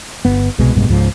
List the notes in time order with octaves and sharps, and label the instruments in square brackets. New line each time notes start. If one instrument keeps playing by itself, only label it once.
[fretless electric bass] G1 B3
D1 C2 B2 G#3
A1 G2 B2 G#3
C#2 G#2 F3